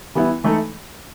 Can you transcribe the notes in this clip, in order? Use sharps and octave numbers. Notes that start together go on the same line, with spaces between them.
E3 G3 B3 E4
E3 A3 D#4 A4